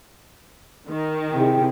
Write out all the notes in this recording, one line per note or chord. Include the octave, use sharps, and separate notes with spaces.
D#3
C3 E4 G#4 G5